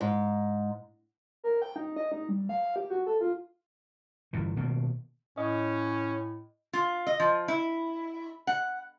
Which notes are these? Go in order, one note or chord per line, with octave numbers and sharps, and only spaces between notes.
G#2
A#4
G5
D#4
D#5
D#4
G3
F5
G4
F#4
A4
F4
G1 A#2 E3
B2 D#3 A#3
A2 C#4 D#5
F4
D#5
F3
E4
F#5